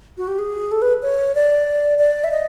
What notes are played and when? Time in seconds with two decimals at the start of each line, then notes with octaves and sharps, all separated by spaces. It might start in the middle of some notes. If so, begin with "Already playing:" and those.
0.18 F#4
0.28 G4
0.39 G#4
0.72 A4
0.82 B4
1.02 C#5
1.35 D5
1.99 D5
2.24 E5
2.31 D#5